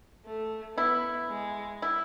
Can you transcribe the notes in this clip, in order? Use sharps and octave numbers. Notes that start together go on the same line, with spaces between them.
A3
B3 E4
G#3
E4